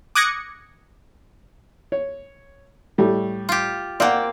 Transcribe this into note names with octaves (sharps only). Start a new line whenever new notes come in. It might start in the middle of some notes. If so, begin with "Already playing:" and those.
D6 D#6 F#6 G#6 A#6 C#7
C#5
A2 G3 A3
F4 G4
A#3 C4 D5 F5 F#5